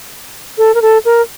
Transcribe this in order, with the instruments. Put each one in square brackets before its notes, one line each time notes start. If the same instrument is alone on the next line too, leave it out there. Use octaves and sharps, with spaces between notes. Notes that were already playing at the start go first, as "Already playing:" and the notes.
[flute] A4
A#4
A4
A#4